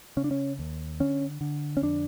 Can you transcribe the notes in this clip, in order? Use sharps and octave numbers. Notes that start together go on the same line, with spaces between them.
C#3 C#4
D4
C#4
D#2
D3 C#4
D3
C#4
F2 D4